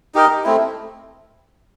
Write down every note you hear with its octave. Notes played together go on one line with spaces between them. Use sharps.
D#4 G4 A#4 D#5
A3 C4 E4